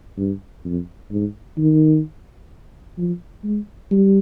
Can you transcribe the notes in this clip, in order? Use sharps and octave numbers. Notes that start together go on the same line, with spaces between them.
G2
F2
G#2
D#3
F3
G#3
G3